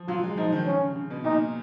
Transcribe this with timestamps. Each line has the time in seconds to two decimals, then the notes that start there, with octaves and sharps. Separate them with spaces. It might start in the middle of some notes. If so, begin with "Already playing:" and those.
Already playing: F3
0.08 F#3 F4
0.23 G#3
0.37 F3 D#4
0.52 D#3
0.66 C#3 C#4
0.81 C#3
0.95 C#3
1.10 B2
1.24 A#2 D#4